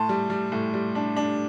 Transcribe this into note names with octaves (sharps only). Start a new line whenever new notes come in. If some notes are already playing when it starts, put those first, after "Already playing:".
Already playing: A2 A5 C6
G3
G3
A2
G3
D4
D4